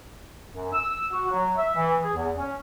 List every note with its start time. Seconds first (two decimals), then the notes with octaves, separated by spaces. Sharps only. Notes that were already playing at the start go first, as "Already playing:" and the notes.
0.52 F#2
0.73 E6
1.10 F#4
1.31 F#3
1.57 E5
1.75 E3
2.03 G#4
2.16 E2
2.36 C#4